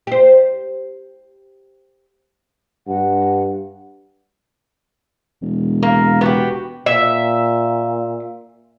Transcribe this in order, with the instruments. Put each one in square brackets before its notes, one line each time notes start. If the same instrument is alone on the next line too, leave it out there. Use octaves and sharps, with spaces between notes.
[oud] G4 C5
[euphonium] G2 [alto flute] F#5
[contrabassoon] E1
[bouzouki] A#3
B3 F#4 G4
[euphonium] A#2 [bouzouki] E5